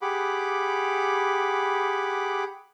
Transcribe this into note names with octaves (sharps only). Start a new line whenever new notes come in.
G4 G#4 F#5 B5 D6